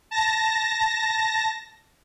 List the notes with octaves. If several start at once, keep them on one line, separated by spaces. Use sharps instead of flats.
A5 A#6